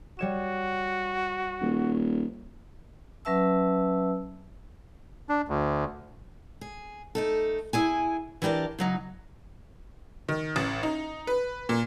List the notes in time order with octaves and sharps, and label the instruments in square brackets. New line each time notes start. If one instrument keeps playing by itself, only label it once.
[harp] G3 C#5 E7 [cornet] F#4
[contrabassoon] D#1
[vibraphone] F#3 C#4 B4 E5 A5 E6
[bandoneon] D4
D2
[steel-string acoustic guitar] G#4
A3 D#4 A4
E4 G#4 G#5
E3 D4 G4 A#4 D5
C#3 F#3 D#4
[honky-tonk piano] D#3
A1
D#4
B4
A#2